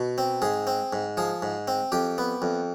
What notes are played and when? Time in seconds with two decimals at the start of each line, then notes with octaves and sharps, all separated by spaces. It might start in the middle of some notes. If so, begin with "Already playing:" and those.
Already playing: B2
0.18 C4
0.42 G#2 G#4
0.67 C4
0.93 G#2
1.17 F3 G#4
1.42 G#2
1.68 C4
1.92 F2 G4
2.18 B3
2.42 F2